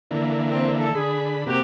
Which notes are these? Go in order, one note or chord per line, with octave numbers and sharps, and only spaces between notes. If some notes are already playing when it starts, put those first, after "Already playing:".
D3 E3 A#3
C4
A4
D3 G#4 B5
C3 A#3 C4 F#4 G4